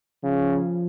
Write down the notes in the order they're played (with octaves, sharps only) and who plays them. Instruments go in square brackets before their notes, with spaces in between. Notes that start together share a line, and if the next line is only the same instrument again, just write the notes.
[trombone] C#3 [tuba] F3